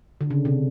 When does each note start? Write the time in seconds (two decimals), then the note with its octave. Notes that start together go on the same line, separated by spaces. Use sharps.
0.21 D3
0.30 C#3
0.45 C3